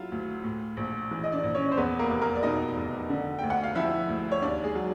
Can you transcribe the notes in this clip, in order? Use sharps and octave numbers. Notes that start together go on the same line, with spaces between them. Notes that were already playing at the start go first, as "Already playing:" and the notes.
Already playing: F#3 E4 F4
D2
A2
A#1
E3
D#5
D4 D5
A#1
C#4 C#5
C5
E2 B3 B4
A#3 A#4
F1 B4
A#3 A#4
D5
B2 D#4 D#5
F1
D3
D2 G5
F#5
F5
F3 E4 E5
D2
C#5
D#2 D4 D5
G#3 G#4
F#3